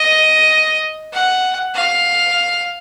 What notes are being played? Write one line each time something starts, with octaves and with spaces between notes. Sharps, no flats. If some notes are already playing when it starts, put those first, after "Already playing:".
Already playing: D#5
F#5
F5